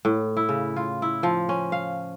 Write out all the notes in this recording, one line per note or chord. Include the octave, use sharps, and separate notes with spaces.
A2
E4
C#3
F4
E4
F3
C#4
F5